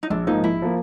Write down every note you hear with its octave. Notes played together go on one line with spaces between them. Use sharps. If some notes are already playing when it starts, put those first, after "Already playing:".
D#4
A#1 D4
G#2 F3 A#3 D#4
A#1 E4
F3 A#3